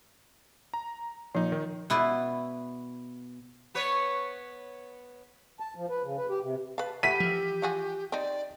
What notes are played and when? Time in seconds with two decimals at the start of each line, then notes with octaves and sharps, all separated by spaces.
0.74 A#5
1.35 A#2 F3 D#4
1.52 D#3
1.90 B2 E4 B4 D5
3.75 B3 B4 C#5
5.60 A5
5.76 F3
5.90 B4
6.04 C#3
6.18 B4
6.29 G4
6.42 C3
6.78 B4 F5 A5
7.03 A3 G4 E5 F#5 B5 B6 D#7
7.20 E3 F3
7.62 F4 F#4 G#4
8.12 C4 D#4 D5